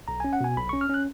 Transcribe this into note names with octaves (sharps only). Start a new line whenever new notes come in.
B1 A#5
C#4 G#5
F#5
B2 G#5
B1 B5
C#4 C#6
F6
C#4 F#6